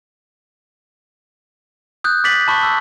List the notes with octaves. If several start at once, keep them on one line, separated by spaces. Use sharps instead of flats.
D#6 F#6 G6
D6 A6 B6 F#7
A5 B5 C#6
E6